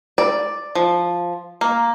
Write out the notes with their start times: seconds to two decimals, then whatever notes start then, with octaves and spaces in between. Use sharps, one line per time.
0.18 D5
0.75 F3
1.61 A#3